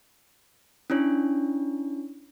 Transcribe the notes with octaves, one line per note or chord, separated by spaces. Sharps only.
C#4 D4 E4 C#5